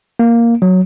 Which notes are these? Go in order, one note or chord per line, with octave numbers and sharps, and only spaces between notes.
A#3
F#3